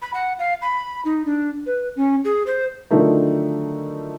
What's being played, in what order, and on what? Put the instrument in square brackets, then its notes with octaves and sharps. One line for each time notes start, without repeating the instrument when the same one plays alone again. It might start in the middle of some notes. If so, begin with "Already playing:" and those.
[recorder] B5
F#5
F5
B5
D#4
D4
B4
C#4
G#4
C5
[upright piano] D3 D#3 F3 F#3 A3 D#4